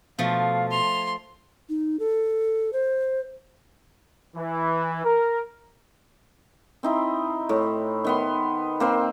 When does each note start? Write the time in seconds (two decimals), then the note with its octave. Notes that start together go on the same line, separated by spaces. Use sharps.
0.19 B2 F3 A3 F5
0.71 C6 F7
1.69 D#4
1.99 A4
2.73 C5
4.35 E3
5.04 A#4
6.83 C4 D#4 E4
7.49 A2
8.04 D#3 B3 C6
8.80 A#3 C4 C5